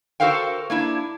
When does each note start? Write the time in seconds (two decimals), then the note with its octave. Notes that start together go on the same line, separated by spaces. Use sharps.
0.20 F#4 A4 A#4 C5 F5 G5
0.70 A#3 D4 E4